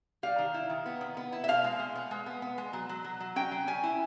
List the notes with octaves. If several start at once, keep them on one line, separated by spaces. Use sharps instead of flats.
G3 F5
D#3
E4
D#3
B3
D#3
B3
E4
E5
B2 F5
G#3
G#3
B3
G#3
B3
B3
G#3
F#3
F#3
F#3
F#3
C#4 G5
F#3
C#4 G#5
E4